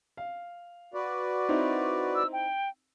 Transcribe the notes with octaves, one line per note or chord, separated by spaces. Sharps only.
F5
F#4 B4 D5
C4 D#4 E4
E6
G5